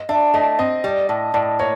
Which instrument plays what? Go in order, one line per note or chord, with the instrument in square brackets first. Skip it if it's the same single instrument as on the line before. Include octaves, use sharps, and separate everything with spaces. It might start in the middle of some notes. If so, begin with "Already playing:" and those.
Already playing: [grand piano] D#5
[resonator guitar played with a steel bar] D4 [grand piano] E5
[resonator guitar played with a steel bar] A3 [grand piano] D#5
[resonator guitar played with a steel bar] C4 [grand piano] D#5
[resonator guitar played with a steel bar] G3
A2
[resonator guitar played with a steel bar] A2 [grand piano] D5
[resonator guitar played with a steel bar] A#3 [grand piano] C#5